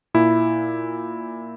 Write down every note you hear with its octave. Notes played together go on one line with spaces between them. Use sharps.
A#2 E4